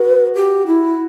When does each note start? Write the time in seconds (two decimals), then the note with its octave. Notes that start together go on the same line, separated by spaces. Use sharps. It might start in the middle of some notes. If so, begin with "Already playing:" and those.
Already playing: F#4 B4
0.35 G4
0.67 E4